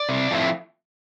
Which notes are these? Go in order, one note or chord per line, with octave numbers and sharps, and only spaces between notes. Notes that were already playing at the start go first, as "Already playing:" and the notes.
Already playing: D5
C3
F3 A3 C4 E4